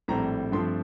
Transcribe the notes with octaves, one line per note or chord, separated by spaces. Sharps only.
A#1 A2 G3 C4 A#5
G2 F3 A3 C4 C6